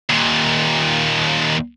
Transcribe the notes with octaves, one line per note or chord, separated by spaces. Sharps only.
D#2 A#2